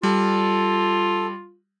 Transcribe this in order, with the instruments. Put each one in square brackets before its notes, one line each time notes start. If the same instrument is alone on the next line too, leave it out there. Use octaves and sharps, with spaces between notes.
[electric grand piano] G3 [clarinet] F4 [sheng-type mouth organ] A4